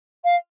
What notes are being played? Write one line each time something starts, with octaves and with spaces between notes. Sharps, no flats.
F5